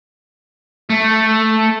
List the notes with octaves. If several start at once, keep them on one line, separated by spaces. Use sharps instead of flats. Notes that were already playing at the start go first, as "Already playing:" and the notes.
A3